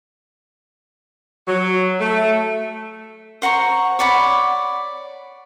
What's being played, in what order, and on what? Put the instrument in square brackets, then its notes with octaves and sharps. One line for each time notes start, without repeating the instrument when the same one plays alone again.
[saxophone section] F#3
A3
[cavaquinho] C5 F#5 A#5 C#6
C#5 D5 F#5 B5